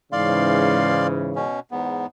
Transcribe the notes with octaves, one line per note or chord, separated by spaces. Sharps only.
G#2 C#3 E3 D5 F5 C6
B2 C#4
E2 G#2 B3